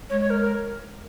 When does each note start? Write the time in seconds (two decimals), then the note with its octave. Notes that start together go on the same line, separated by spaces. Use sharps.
0.10 G#3 C#5
0.21 C#5
0.30 A#4
0.41 A#4